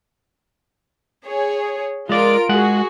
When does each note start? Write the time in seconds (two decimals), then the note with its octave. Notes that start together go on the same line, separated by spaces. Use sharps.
1.25 G#4 C#5
2.09 G#3 F4 A#4 D5 D7
2.49 G#3 F#4 G#4 F#5